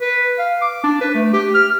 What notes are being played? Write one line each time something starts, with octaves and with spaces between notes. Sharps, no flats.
B4
F5
D6
D4
B4
A3
G4
F6